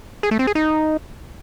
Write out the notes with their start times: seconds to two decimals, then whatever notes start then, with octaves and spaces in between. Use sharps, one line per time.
0.23 G#4
0.31 A3
0.39 C4
0.47 G#4
0.55 D#4